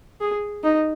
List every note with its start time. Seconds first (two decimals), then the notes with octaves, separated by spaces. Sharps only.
0.21 G#4
0.64 D#4